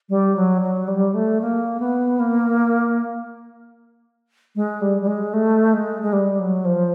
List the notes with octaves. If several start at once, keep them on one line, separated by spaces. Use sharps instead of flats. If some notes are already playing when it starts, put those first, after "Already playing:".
G3
F#3
F#3
G3
A3
A#3
B3
A#3
G#3
G3
G3
G#3
A3
G#3
G#3
G3
F#3
F3